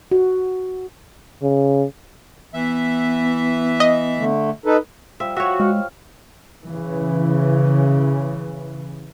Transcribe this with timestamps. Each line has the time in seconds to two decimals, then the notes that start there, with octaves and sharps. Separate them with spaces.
0.12 F#4
1.43 C#3
2.54 E3 B3 E5
3.80 D#5
4.18 D3 A3
4.66 D#4 A4 B4
5.20 F3 G3 E5
5.36 F#4 C#5 E5
5.60 G#3 F5
6.64 C#3 E3